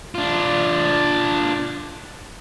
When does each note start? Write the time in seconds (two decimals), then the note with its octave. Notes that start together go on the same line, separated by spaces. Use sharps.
0.15 D4 F4